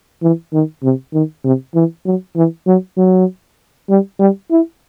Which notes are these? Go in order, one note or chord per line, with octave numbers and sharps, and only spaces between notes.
E3
D#3
C3
D#3
C3
E3
F#3
E3
F#3
F#3
G3
G3
E4